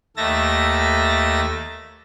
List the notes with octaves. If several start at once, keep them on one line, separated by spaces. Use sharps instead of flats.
D#2 A3 E5 A6 A#6